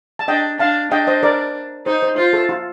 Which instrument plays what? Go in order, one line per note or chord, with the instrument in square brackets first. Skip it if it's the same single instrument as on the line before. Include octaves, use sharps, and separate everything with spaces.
[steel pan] A5
[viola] D4 [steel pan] D#5 G5
[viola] D4 [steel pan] F5 A5
[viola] D4 [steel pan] D#5 G5
[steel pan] C5 D#5
A#4 D5
[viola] D#4 [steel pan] C5
[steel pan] C5
[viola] F4 [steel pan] C5
[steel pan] A4
F4